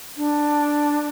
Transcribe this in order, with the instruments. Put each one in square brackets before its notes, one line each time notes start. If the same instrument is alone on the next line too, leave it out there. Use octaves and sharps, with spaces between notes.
[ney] D4